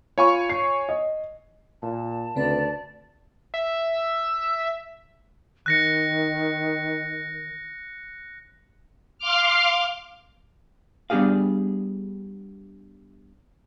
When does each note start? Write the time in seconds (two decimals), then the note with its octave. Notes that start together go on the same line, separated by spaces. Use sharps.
0.18 F4 C#5 F5 G#5 B5 C#6
0.49 C7
0.89 D#5
1.82 A#2 A5
2.36 D2 C#3 C4 B4 D5
3.54 E5
5.66 D#3 F#6 A#6 C#7
9.19 F5 C6 D6 F6
11.10 G3 B3 D4 G4 G#4 F5